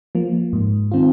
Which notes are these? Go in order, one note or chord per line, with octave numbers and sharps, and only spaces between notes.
F3 A#3
G#2
D#3 C4 F4